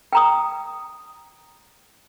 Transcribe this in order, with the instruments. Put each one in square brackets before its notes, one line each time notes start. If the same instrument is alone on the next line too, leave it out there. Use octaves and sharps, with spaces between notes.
[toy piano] G5 A#5 D#6